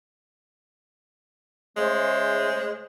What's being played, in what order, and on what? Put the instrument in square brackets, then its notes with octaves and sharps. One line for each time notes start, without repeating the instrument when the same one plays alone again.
[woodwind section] C#3 A3 C5 [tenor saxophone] G#3